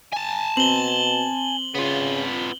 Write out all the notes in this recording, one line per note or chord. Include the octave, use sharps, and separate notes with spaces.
G#5 A5
B2 C4 F#7 G7
C#3 B3 F4